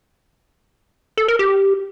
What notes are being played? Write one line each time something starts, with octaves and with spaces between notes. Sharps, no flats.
A4
A#4
G4